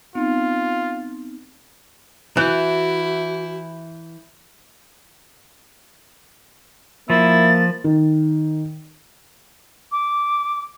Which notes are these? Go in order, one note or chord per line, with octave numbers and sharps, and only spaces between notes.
B3 C4 D#4 F4
E3 E4 F#4 F#6 G6
F3 A#3 E4 A6
D#3
D6